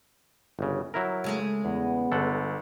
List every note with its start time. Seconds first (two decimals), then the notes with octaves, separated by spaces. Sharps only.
0.59 G1 C#3
0.94 F#3 E4 A#4
1.24 C#3 G#3 A3
1.65 E2 B3
2.12 G1 A4 F#5